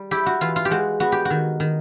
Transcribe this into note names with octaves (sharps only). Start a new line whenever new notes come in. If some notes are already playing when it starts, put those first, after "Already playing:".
Already playing: G3
E4 G4
F#4
E3 F4
F4
G4
G#3 F#4
B3 F#4
G4
F#4
D#3
D#3